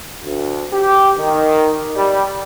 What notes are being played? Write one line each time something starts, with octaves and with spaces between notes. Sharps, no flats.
D2
G4
D#3
G3